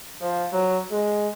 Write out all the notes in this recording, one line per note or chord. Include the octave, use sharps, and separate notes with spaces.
F3
F#3
G#3